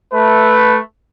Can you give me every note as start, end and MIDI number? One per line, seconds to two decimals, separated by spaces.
0.13 0.77 57
0.13 0.77 71